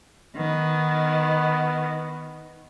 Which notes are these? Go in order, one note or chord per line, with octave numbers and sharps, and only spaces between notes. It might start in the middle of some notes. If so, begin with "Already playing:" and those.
D#3 B3